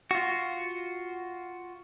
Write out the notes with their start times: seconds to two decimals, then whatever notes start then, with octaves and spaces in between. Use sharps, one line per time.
0.11 F4 F#4